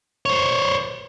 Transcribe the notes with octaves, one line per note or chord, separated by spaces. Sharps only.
C5 C#5